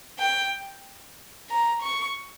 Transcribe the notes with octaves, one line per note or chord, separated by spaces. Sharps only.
G5
A#5
C#6